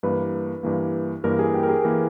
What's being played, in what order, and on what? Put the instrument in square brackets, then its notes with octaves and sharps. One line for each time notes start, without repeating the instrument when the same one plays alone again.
[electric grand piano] G2 E3 A#3 [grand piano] B4
[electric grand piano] G2 E3 A#3
[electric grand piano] G2 E3 A#3 [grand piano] A#4
[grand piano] G#4
G4
A#4
G#4
[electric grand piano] E3 A#3 [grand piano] A#4